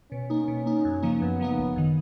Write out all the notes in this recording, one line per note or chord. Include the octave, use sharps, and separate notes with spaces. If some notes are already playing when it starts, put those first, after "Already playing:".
B2 C#4
A#3 D#4
B2
A#3 D#4
F#2
C#3 F3 A#3 D#4
F#2 B3
C#3 F3 A#3 D#4
G#1
F#2 D#3